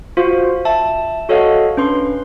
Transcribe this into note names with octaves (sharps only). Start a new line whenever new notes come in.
F4 F#4 C5 F5
E5 A5
F#4 A4 C#5 D#5 F5 F#5
C#4 D4 B4 C6